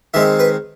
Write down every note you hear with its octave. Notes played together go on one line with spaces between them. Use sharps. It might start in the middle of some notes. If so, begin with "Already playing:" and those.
D#3 G#3 C4 E5
B4